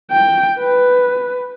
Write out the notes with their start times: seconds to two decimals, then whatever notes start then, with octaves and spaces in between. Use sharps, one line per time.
0.11 G5
0.59 B4